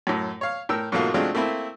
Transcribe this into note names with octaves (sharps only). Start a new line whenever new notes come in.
F#2 A2
C#5 F5
A2 A#4 G5 E6
G#2 B2 F#3 A3 A#3 F4
F#3 G#3 A3 C4 D4 F4
A3 A#3 C4 E4